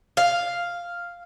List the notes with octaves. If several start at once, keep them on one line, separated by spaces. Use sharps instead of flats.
F5